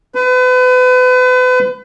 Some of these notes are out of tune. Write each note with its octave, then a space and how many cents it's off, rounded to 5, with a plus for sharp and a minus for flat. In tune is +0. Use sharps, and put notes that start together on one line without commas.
B4 +35